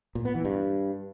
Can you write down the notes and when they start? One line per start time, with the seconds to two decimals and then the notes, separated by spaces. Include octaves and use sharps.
0.15 A#2
0.25 B3
0.35 E3
0.45 G2